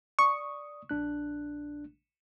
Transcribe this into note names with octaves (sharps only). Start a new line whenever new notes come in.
D5 C#6 D#6
A#1 D4 F#6